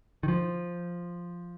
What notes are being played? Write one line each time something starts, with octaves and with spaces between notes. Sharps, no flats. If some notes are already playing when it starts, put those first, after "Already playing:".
D#3
F3